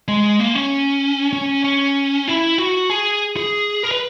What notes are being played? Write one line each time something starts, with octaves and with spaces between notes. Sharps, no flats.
G#3
A#3
C#4
C#4
C#4
E4
F#4
G#4
G#4
A#4
B4